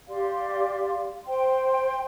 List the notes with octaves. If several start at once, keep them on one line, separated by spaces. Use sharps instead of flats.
G4 D5 F5 C6
C5 G5 C6